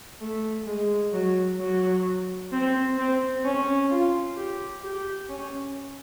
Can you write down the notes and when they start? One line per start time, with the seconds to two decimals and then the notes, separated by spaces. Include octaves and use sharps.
0.21 A3
0.67 G#3
1.13 F#3
1.59 F#3
2.52 C4
2.98 C4
3.45 C#4
3.91 F4
4.37 G4
4.83 G4
5.29 C#4